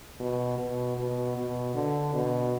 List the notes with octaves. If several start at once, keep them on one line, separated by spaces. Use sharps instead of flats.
B2
B2
B2
B2
D3
B2